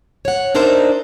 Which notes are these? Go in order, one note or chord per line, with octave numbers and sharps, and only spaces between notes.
C#5 F#5
D4 D#4 A#4 C5 D5 E5